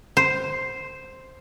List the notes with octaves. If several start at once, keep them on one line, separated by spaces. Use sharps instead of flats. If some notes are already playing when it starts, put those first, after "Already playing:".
C5